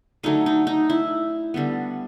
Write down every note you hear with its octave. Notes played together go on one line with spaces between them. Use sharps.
D3 F#3 A3 D#4
D#4
D#4
E4
D3 G3 B3